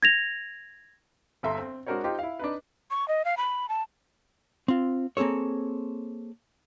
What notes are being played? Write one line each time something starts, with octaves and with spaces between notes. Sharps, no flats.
G#6 A#6 F7
G1 A4 E5 A#5 C6
C4
G#3 D4 F#4 A#4 C5 C#5
D#4 F4 G4 C5
E4 F5
D4 D#4 B4
C#6
D#5
F5
B5
A5
C4 F4
A#3 C4 G#4 A4 C#5